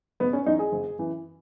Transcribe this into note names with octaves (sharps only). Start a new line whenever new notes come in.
F#1 B3
C#4
F#2 E3 D#4
G#4
F#1
F#2 E3